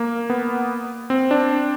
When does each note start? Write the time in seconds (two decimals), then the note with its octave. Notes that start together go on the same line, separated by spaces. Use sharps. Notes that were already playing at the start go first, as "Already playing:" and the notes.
Already playing: A#3
0.30 B3
1.10 C4
1.31 D4